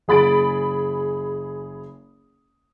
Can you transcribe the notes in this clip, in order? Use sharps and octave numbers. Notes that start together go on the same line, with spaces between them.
F#1 G#4 B5 A6 D7